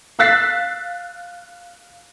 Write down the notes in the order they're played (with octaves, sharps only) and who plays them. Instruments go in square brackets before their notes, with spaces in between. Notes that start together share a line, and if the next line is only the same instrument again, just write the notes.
[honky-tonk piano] F5 E6 F#6 A6 B6 C7